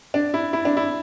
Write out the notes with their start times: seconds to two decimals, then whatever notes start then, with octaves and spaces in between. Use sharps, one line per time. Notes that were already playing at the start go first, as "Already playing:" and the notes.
0.14 D4
0.34 E4
0.53 E4
0.65 D4
0.77 E4